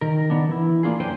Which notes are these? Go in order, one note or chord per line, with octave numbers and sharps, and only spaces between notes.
D#3 A#4
D#3 B3 D4
E3 E4
A#3 D4 F4 G#4
F#2 D3 B4 C5 G5 G#5